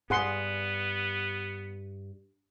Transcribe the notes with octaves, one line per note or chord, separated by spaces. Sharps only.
G2 B3 G#4 F#5 C6